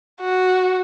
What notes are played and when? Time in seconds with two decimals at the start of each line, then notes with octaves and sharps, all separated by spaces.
0.21 F#4